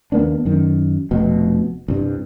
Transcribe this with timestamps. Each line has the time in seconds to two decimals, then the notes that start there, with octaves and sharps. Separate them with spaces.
0.12 D#2 A#3 B3 D4
0.45 F#2 D#3
1.11 F1 B2
1.88 C2 G2